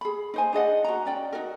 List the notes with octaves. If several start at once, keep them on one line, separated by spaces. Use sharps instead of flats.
G#4 B5
D#4 C5 G#5
D4 G#4 D#5 F#5
F#4 A#5
C#4 D5 G5
D#4 F#4 A#4